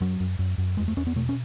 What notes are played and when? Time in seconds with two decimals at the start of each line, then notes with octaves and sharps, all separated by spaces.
0.01 F#2 F#3
0.20 F#2
0.39 F#2
0.58 F#2
0.77 E2 G#3
0.88 A3
0.97 E2 C#4
1.07 B3
1.16 B2 A3
1.29 C#4